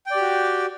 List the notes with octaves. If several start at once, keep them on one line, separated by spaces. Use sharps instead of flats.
F#4 G4 D5 G5